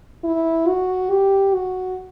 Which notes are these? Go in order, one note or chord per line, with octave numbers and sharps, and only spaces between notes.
E4
F#4
G4
F#4